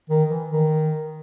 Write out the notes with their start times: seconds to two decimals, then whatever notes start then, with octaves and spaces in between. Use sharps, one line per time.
0.09 D#3
0.29 E3
0.50 D#3